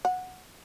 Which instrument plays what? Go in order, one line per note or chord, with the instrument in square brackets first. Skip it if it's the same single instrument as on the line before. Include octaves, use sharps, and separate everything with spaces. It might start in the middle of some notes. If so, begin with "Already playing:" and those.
[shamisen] F#5